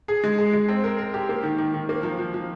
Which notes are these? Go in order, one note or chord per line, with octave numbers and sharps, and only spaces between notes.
G#4
G#3
G#4
G#3
C4
A#4
A#4
G4
A#3
D#3
D#3
D#3
A#3
F3
F3
F3